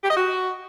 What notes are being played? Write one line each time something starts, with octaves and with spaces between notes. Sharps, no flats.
G4
D#5
F#4